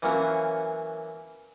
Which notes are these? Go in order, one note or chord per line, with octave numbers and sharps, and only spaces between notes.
E3 F#3 A#3 C#4